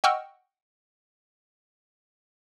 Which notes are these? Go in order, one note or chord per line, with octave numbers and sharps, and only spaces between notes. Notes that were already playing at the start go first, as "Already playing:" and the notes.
D#5 F#5 G5 C#6 E6 F6